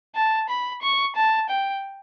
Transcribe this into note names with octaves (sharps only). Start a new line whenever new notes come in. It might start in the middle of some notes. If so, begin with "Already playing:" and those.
A5
B5
C#6
A5
G5